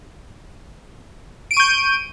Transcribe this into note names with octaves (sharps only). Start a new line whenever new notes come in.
C#6 G6 D7 D#7